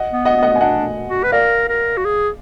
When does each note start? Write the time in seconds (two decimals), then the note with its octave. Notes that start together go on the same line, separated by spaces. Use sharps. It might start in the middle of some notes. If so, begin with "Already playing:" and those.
Already playing: D#5 F#5
0.12 B3
0.25 D#5 F#5
0.37 B3
0.43 D#5 F#5
0.53 B3 G#5
0.60 D4 D#5 F#5
1.08 F#4
1.23 B4
1.32 A#4 D5 F5
1.69 A#4
1.97 F#4
2.05 G#4